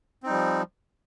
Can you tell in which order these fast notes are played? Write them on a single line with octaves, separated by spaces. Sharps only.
C4 D#4 G3 F3